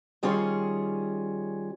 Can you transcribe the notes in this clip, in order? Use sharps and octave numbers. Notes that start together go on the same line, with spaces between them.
D#3 G3 C#4 F4 G#4 C#5